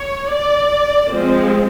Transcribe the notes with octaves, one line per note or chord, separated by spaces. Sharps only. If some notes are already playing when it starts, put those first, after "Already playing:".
Already playing: C#5
D5
F3 G#3 C4